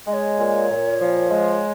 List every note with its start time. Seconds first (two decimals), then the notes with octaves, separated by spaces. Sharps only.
0.07 G#3 D#5
0.13 C#5
0.38 A#2
0.70 A#2
1.01 F3
1.31 G#3